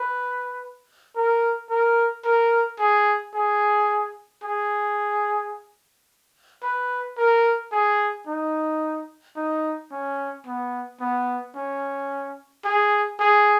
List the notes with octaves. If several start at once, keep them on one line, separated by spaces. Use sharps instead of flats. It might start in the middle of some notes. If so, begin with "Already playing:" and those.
Already playing: B4
A#4
A#4
A#4
G#4
G#4
G#4
B4
A#4
G#4
D#4
D#4
C#4
B3
B3
C#4
G#4
G#4